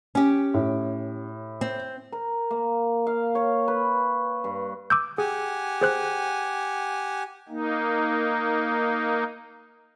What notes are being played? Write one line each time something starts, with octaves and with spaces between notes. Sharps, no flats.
C#4 G4
A2
C4
A#4
A#3
F5
C#5
B4
G2
D6 E6 G6
G4 G#4 F#5 G#5
G#4 C5 F#6
A#3 D#4